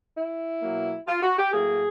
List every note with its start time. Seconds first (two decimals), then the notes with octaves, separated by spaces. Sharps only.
0.16 E4
0.62 B2 F#3 A#3
1.08 F4
1.22 F#4
1.38 G4
1.52 A2 F#3 A#3 G#4